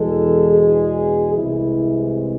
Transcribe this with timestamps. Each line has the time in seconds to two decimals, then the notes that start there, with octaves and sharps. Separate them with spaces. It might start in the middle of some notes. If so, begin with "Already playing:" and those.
Already playing: E2 B2 G#3 A4
0.52 G#4
1.34 C2 C3 E3 G#3 E4